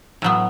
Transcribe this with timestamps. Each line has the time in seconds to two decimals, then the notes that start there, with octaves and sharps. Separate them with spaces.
0.22 A2 F#3 B3